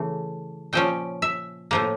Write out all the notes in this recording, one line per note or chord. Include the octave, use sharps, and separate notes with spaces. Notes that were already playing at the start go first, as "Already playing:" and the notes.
Already playing: C#3 E3 A3
A#2 F3 C#4 G5
E5
A2 F3 A#3